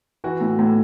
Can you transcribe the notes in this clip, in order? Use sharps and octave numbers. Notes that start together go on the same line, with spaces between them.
E3 F#4
A2
A2